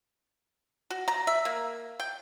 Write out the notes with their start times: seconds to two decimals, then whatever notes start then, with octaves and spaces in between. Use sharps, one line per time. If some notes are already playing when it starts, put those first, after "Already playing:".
0.90 F#4
1.08 A#5
1.27 E5
1.45 A#3
2.00 G5